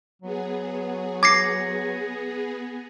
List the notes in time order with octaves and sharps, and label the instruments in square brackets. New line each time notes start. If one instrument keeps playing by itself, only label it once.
[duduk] F#3 [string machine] B3 G#4
[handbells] D6 C7 [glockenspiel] G#6 A#6 C#7